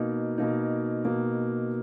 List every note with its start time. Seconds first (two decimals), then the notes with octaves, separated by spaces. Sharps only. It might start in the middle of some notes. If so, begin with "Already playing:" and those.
Already playing: B2 A#3 D#4
0.38 B2 A#3 D#4
1.04 B2 A#3 D#4